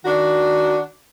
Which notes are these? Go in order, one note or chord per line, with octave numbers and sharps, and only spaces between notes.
D#3 D4 F#4